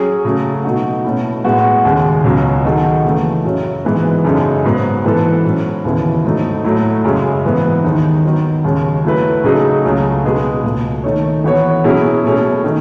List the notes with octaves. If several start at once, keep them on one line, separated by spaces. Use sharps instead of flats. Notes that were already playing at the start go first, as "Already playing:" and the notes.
Already playing: F#3 C#4 G#4 C#5
C#3 F#3 A3
B2 A3 D#4 F#4
B2 A3 C#4 E4
A2 G#3 B3 F#4
D#2 C#3 G#3
C#2 B2 F#3 C#4
D#3 G#3 D#4 F#4 A4
C#3 E3 A3
F#2 C#3 F#3 C#4
G#2 E3 G#3 B3 D#4
F#2 C#3 G#3 D#4 A4
G#2 F#3 B3
G#2 E3 B3 E4 A4
G#2 F#3 C#4
D#2 C#3 E3 B3 E4
G#2 F#3 A3 D#4
A2 F#3 A3 E4
F#2 C#3 G#3
G#2 E3 B3
D#2 D#3 G#3 D#4
D#3 F#3 B3
D#2 C#3 G#3 C#4
F#3 A3 E4 B4
C#3 F#3 A3 D#4 G#4
C#2 C#3 F#3 A3
B2 G#3 B3 D#4 G#4
C#2 B2 A3
D#3 A3 D#4 A4 C#5
E3 B3 F#4 A4 C#5
B2 F#3 C#4 E4 G#4
B2 A3 C#4 G#4
D#3 A3 D#4